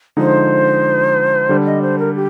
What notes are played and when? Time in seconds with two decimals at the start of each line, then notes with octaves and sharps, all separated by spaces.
0.17 D3 F3 G#3 D#4 C5
1.49 D3 G3 D4
1.65 D#5
1.81 C5
1.98 A#4
2.14 G4